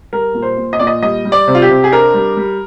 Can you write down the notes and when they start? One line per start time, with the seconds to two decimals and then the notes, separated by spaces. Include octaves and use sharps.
0.13 G3 A#4
0.34 A#2
0.42 C5
0.57 A#2
0.73 D#5
0.79 A#2 D5
0.87 D#5
1.02 G3 D#5
1.25 G3
1.32 D5
1.48 C3
1.55 F4
1.62 G4
1.70 C3
1.84 G#4
1.92 D4 A#4
2.14 G3
2.37 G3